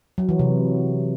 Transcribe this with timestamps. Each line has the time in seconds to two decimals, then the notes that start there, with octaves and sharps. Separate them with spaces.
0.18 F#3
0.29 E3
0.39 C3